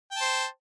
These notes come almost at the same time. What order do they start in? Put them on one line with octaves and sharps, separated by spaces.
G5 A5 C5